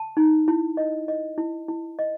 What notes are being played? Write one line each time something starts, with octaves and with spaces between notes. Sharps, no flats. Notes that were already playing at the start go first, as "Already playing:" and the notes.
Already playing: A5
D#4
E4
D#5
D#5
E4
E4
D#5